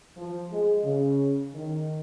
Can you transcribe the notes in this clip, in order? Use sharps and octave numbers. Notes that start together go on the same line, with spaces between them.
F3
G#3
C#3
D#3